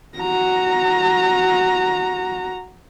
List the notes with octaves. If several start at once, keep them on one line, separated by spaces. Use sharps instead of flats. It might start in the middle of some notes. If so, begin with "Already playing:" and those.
F#4 A#5